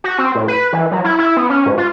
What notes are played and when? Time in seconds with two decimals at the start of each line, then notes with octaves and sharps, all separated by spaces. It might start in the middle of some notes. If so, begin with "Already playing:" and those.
0.04 F#4
0.18 C4
0.35 A2
0.48 B4
0.73 E3
0.91 F#3
1.04 E4
1.18 E4
1.37 B3
1.50 C#4
1.66 G#2
1.78 F4